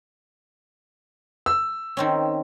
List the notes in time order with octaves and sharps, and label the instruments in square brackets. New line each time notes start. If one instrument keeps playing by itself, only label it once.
[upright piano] E6
[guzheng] D#3 C4 C#4